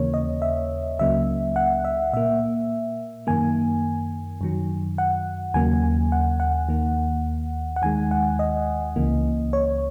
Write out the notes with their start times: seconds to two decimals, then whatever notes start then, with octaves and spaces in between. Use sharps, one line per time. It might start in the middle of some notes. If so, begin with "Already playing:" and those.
Already playing: D#2 C#3 E3 A#3 C#5
0.14 D#5
0.42 E5
0.99 C#2 C#3 F#3 A#3 E5
1.56 F#5
1.85 E5
2.13 A#2 A#3 E5
3.27 F#2 D#3 A#3 G#5
4.41 F#2 D#3 F#3
4.98 F#5
5.54 D#2 C#3 F#3 A#3 G#5
6.12 F#5
6.40 F#5
6.69 D#2 D#3 A#3
7.76 F#5
7.82 D#2 D#3 G#3 G#5
8.11 F#5
8.39 D#5
8.96 C#2 C#3 E3 A#3
9.53 C#5